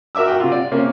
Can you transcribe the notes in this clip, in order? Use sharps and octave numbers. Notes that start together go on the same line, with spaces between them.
F#4 A#4 E5 D6 E6
F#4 G5 D6
C3 F4
D5
C3 A#3 C#4